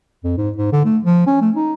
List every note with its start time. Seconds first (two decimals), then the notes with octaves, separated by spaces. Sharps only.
0.24 F2
0.37 G#2
0.56 G#2
0.72 D3
0.85 A3
1.04 F3
1.27 C#4
1.41 A3
1.56 D#4